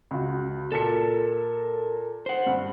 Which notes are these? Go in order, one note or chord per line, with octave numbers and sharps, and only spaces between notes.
C#2 F#4
A#2 A4 A#4 A5 C#7
C5 F#5
G2